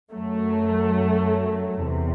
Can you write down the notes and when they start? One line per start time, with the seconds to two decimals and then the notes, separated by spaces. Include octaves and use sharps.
0.12 F#2 F#3 A3
1.84 E2 C3